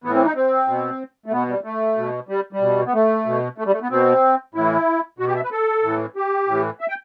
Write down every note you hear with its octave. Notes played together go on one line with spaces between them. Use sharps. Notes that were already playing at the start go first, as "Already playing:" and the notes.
A2 E3 B3
C4
D#4
C4
B2
A3
B2 B3
G3
A3
B2
G3
G3
B2
B3
A3
B2
A3
G3
A3
B3
B2 C4
A2 E3 E4
B2 F#4
G4
E5
B4
A4
A2 E3
G4
A2 E3
E5
G5